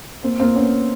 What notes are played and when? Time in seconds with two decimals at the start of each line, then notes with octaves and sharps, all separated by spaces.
0.23 A#3 C4
0.39 A#3 C4
0.55 B3 C#4